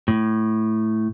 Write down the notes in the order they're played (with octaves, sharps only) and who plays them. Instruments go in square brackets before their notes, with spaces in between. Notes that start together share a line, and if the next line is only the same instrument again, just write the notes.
[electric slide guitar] A2